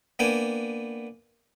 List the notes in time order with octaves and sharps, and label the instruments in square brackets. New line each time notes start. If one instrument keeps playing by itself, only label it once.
[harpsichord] A#3 B3 D4 G5 G#5